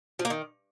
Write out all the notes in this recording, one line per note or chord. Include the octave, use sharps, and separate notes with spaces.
F3
A#3
D#3